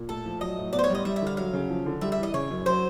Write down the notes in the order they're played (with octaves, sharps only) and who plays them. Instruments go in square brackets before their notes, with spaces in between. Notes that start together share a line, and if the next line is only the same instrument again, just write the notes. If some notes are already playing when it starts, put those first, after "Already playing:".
Already playing: [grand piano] A#2
[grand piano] A3 [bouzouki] A4
[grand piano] F3
[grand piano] F#3 [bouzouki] D#5
[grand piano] A2
[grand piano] B3 [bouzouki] D5
[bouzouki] C5
C#5
[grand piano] G3 [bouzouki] D#5
[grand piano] G3 [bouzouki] E5
[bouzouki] E5
[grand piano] D3 [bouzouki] F5
[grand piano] F#3 [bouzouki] F5
[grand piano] C#3
F3
D3
[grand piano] G3 [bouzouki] E5
[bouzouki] E5
[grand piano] E3
[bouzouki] D#5
[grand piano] C#3 [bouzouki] C#5
[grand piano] F#2
[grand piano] F#3 [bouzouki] C5